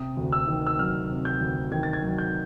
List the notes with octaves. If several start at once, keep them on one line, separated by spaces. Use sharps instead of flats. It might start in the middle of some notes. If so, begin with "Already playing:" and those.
Already playing: C3 D#6
D2
E6
D#3
E6
F#3 F6
C3
G6
D2
D#3 G#6
A6
G#6
F#3
G6